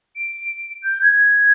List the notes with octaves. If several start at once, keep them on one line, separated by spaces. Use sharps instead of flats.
D7
G6
G#6